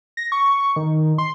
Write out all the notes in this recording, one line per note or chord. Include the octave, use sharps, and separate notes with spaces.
A#6
C#6
D#3
C6